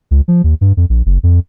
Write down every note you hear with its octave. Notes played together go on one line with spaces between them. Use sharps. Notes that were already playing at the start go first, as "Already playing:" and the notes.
C#2
F3
D#2
G2
F2
A#1
F#1
F2